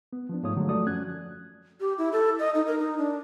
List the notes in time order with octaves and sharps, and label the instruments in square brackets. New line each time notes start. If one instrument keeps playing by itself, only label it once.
[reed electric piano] B3
F3 B3 D4
G#2 F3 A3 D#4 C#5 D#6
D3 F3 F#3 G#3 A3
F#2 A3 F#4 A4 D5 D#6
F3 C#4 F#6 G#6
[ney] G4
E4
A4
D#5
D#4
A#4
D#4
D4